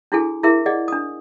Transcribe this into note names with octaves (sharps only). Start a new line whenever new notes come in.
D4 E4 F#4 G#4 A4 G#5
E4 G#4 A#4 E5 C6
G#4 D5 D#5 F#5
D4 D#6